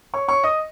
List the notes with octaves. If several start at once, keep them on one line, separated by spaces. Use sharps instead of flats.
C#5 C#6
C#5 C#6
D#5 D#6